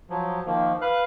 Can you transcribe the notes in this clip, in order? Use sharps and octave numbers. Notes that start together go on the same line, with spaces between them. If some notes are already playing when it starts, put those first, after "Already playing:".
F3 F#3
D#3 F3 A#3
B4 F5 F#6